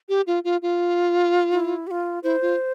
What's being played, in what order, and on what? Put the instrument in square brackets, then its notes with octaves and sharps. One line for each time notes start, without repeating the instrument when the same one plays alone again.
[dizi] G4
F4
F4
F4
[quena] E4
G4
F4
[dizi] E4 [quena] C5
[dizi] F4